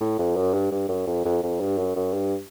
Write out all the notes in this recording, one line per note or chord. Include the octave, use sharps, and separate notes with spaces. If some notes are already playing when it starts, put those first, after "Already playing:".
A2
F2
F#2
G2
G2
F#2
F2
F2
F2
G2
F#2
F#2
G2